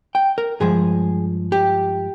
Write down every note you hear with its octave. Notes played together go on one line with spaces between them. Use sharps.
G5
A#4
G2 F3 G#3 G#4
G4